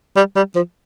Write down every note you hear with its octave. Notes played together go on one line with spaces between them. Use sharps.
G3
G3
F3